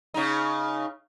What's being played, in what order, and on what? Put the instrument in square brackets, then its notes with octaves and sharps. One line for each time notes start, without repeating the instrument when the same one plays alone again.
[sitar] C#3 D#4